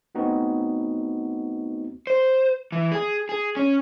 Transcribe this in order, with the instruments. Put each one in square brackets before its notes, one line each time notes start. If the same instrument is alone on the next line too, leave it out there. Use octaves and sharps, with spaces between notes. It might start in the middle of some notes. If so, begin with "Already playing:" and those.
[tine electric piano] A3 B3 C4 D#4 F#4
[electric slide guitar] C5
E3
G#4
G#4
C#4